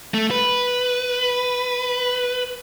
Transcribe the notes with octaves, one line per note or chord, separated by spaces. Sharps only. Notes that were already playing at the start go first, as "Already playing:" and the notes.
A3
B4